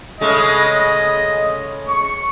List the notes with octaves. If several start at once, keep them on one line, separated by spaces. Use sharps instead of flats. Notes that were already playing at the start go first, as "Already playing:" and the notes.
C#3 G#3 A3 D#5
C#6